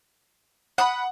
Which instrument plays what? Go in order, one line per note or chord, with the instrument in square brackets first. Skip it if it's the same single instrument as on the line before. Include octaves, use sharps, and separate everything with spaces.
[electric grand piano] F#5 [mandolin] B5 D#6 F#6